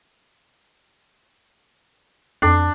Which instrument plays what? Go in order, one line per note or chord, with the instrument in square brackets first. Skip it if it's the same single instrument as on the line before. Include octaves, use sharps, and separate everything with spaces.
[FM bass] F2 [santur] D4